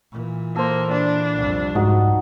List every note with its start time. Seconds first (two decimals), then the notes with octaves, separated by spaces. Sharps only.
0.12 A#2 E3
0.56 A#3 A4 C5
0.91 D4 B5
1.36 C2 F2
1.75 G#2 D#4 F#4